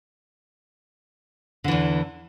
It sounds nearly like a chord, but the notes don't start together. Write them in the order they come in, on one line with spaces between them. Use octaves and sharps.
D3 E3 E2